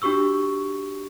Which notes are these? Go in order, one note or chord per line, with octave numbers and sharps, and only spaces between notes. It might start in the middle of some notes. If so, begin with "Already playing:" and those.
D4 F#4 G4 C#6 E6